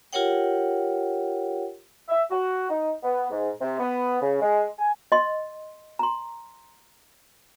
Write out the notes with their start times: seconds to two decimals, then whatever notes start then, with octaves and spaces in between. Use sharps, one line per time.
0.13 F4 G4 A#4 C#5 F#5 G5
2.08 E5
2.30 F#4
2.70 D#4
3.03 B3
3.31 G#2
3.61 C3
3.79 B3
4.22 C#3
4.42 G#3
4.79 G#5
5.12 D#5 C6
5.99 A#5 C6